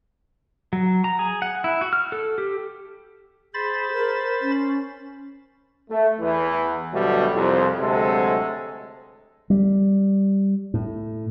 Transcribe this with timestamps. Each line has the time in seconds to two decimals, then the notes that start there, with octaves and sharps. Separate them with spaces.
0.73 F#3
1.04 A#5
1.19 G#4
1.42 F#5
1.64 E4
1.81 F#4
1.93 F6
2.12 A4
2.38 G4
3.54 G#4 C5 B5 A6
3.93 A#4
4.41 C#4
5.90 A3
6.20 E2 E3
6.94 D2 B2 F#3 G3 A3
7.34 C2 F2
7.80 D2 C3 F#3 G#3 A4
9.50 G3
10.74 A2